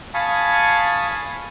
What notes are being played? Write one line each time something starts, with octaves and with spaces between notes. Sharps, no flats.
F5 G#5 A5 B5 C#6 D#6